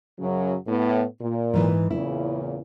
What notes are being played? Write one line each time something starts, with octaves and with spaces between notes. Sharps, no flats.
F#2 C#3 F#3
A2 B3
A#2
G#2 E3 B4
E2 A#2 C#3 E4